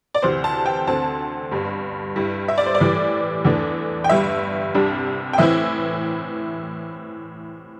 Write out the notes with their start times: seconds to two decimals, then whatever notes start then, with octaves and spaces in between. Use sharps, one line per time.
0.14 D5
0.22 D2 C3 E3 C5
0.44 A5
0.66 G5
0.87 D2 D3 C4 A5
1.51 G1 G2 G3
2.16 G2 G3 E4
2.48 E5
2.58 D5
2.66 C5
2.75 D5
2.80 A2 E3 G3
3.45 E2 E3 A3 D4
4.04 G5
4.09 G1 G2 G3 E5
4.74 C2 C3 G3 D4
5.33 G5
5.38 A2 E3 C4 E4 E5